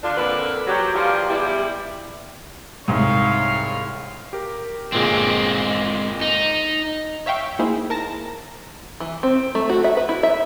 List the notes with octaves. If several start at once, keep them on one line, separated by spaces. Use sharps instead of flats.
D3 D4 F4
F2 A#2 D3 D4 A#4 B4
F#3 G4
E3 F3 G3 A#3 F4 G4
E2 G3 E4
C2 G#2 C#5 F5
G4 A#4
G1 A#2 G#3 C4 G#4
D#4
C#5 E5 F5 G5 C#6
A#3 D#4 E4 G#4 C5
A#4 A5 A#6
E3
C4
A3
F#4
E5
B4
E4
E5